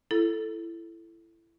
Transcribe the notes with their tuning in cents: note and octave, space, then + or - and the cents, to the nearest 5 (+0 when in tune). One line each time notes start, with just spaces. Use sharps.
E4 +20 A4 +0